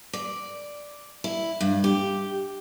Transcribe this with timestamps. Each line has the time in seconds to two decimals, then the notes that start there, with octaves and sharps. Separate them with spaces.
0.13 D5
1.24 E4
1.61 G2
1.84 G4